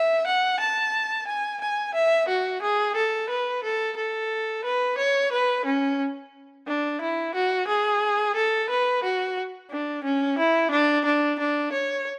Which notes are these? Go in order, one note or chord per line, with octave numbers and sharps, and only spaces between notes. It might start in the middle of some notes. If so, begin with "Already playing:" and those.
Already playing: E5
F#5
A5
G#5
G#5
E5
F#4
G#4
A4
B4
A4
A4
B4
C#5
B4
C#4
D4
E4
F#4
G#4
A4
B4
F#4
D4
C#4
E4
D4
D4
D4
C#5